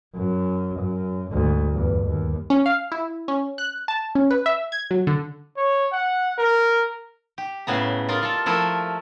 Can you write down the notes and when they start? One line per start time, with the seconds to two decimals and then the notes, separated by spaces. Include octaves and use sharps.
0.16 F#2
0.79 F#2
1.30 D2 G#2
1.71 E2 G2
2.05 D#2
2.50 C#4
2.66 F5
2.92 E4
3.28 C#4
3.58 F#6
3.88 A5
4.15 C#4
4.31 B4
4.46 E5
4.72 G#6
4.91 F#3
5.07 D3
5.57 C#5
5.93 F#5
6.39 A#4
7.38 G4
7.67 A2 C#3 B3 A#5
8.09 F4 A#4 D5 D#5
8.23 F4 A4
8.46 F3 A3 E4 A4 A#4